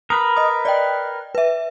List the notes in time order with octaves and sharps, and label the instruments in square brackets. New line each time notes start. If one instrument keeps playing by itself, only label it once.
[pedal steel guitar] A#4 B4 [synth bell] D#6
[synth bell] D#5 D#6
D5 D#5 G5
B4 E5